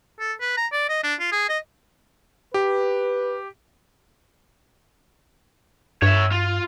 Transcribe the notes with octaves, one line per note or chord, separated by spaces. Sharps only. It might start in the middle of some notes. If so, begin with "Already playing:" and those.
A4
B4
A#5
D5
D#5
D4
F4
G#4
D#5
G4 B4
G2 C#5 E5
F4